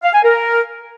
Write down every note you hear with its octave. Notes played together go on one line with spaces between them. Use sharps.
F5
G#5
A#4